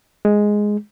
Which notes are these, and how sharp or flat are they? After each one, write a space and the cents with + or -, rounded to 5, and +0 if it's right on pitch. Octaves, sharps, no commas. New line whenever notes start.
G#3 +0